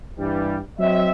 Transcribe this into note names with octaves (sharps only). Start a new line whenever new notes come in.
G2 E3 G3
F#3 C4 D#5 E5